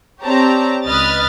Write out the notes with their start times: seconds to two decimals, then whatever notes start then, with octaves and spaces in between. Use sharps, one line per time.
0.23 C4 G4 C#5 D5 A5 A#5
0.86 C#2 B4 D#5 D#6 F6 A6